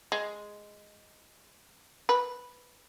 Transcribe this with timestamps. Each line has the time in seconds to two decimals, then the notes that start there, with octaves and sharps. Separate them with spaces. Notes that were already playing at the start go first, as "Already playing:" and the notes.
0.12 G#3
2.09 B4